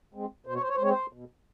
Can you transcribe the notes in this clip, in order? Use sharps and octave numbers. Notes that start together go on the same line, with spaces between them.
G#3 C4
B2 C5
C#5
C5
C#5
C5
G#3 C4 C#5
C5
B2